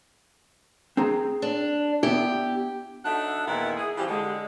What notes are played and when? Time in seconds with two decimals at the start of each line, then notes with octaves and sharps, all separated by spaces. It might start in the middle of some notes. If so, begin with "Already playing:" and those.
0.97 C4 G#4 A#5
1.42 D4
2.03 B3 E4 G4
3.05 F#3 D4 D#4 A4 E5 F#5
3.46 E2 A#2 D#3 B3 E4
3.77 G#4
3.97 E3 F3 G3 C4 G4
4.09 D3 G#3